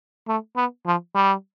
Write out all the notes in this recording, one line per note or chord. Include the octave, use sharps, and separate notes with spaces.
A3
B3
F3
G3